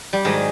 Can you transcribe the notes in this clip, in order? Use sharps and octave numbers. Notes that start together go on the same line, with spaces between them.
G3
G#2 D#3 F#3 G#3